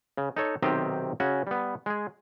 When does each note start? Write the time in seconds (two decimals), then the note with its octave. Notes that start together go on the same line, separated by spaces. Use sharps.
0.17 C#3
0.36 D#4 A4 C#5
0.62 B1 C3 D#3 C4 G4 D#5
1.20 C#3 C#4 F#4
1.47 G3 B3
1.86 G#3 G#4